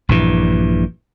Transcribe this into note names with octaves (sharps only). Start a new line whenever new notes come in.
A#1 G2 E3